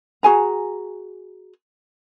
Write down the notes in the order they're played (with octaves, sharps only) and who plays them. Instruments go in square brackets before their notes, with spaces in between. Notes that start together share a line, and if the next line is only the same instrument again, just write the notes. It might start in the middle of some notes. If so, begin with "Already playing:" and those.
[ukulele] F#4 G#4 G#5 A#5